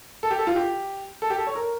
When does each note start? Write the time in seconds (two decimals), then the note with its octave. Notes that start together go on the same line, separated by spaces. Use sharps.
0.23 A4
0.31 G4
0.39 A4
0.47 F4
0.55 G4
1.22 A4
1.30 G4
1.38 A4
1.47 C#5
1.55 A#4